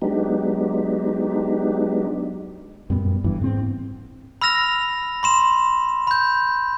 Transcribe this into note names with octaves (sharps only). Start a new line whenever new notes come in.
F#3 G#3 B3 D4 D#4 G4
F#2 A#2 G3 B3
G1 G2 E3
G#2 B3 C4
B5 E6 F6 A#6 F7
B5 C6 E7
B5 G6